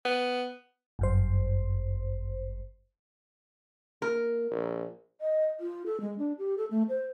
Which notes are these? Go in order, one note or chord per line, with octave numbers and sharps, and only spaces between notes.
B3
G1 F#2 C5
A#3 A#4
A#1
D#5
F4
A4
G#3
D4
G4
A4
A3
C5